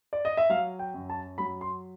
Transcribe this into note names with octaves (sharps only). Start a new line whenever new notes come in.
D5
D#5
E5
F#3 F5
G5
F#2
A5
F#3 B5
C6